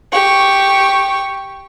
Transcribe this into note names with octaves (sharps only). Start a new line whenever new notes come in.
G4 C#6